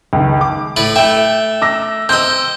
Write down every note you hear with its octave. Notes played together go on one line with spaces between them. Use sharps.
C#2 D#3
D6
A2 B4 D5
A3 E5 G5
D6 E6 A#6
C4 D#5 E6 G6